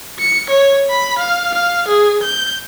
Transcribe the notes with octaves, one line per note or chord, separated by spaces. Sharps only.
C#7
C#5
B5
F5
F5
G#4
G6